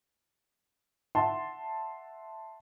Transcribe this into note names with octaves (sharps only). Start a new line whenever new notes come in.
E5 F#5 A5 C6